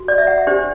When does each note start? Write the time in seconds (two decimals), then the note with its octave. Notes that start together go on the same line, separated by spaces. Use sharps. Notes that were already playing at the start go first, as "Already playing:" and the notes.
Already playing: F#4
0.08 D5
0.18 E5
0.27 F#5
0.38 E5
0.47 D4 G4 C5 D5